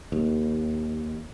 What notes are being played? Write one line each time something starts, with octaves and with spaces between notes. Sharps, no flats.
D#2